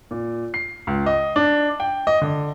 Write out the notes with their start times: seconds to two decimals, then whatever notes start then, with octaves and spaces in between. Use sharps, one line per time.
0.11 A#2
0.54 C7
0.87 C#2
1.06 D#5
1.36 D4
1.80 G5
2.07 D#5
2.22 D3